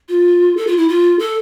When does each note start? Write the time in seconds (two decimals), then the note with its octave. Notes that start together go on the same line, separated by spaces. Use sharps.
0.09 F4
0.57 A4
0.67 F4
0.77 E4
0.88 F4
1.19 A4